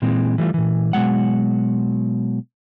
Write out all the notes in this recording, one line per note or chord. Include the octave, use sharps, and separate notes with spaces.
A#2 E3 G#3 C4
E3 G3 A3 F4
A#2 E3
B2 F#3 G#3 F#5